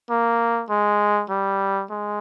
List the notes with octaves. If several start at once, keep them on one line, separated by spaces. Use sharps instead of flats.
A#3
G#3
G3
G#3